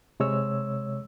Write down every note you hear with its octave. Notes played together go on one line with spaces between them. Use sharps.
C3 G#3 C#5 E6